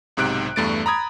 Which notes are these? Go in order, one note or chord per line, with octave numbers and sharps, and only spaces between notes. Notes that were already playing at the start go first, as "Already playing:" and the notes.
B1 G#2 C3 F#6 D7
E2 G2 A3 A6 D7
A#5 B5 D#6 G#6